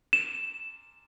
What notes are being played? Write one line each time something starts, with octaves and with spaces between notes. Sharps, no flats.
E7